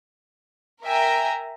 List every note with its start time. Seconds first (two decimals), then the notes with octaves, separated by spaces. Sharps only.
0.84 A#4 E5 G5 G#5 A#5